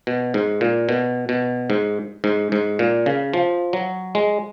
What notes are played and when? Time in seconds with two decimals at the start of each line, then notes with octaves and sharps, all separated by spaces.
0.07 B2
0.34 G#2
0.61 A#2
0.89 B2
1.29 B2
1.70 G#2
2.24 G#2
2.52 G#2
2.79 A#2
3.06 C#3
3.33 F3
3.73 F#3
4.15 G#3